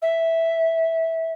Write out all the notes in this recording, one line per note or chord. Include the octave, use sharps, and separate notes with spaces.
E5